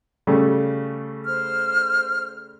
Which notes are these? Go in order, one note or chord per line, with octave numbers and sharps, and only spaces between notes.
C#3 G3 A3
C5 F6